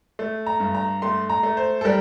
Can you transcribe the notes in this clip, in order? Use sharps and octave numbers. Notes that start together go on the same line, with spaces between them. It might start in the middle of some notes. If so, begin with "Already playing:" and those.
A3
A#5
G2
A#5
A3 C6
A#5
A3
C5
A4
G3 A#4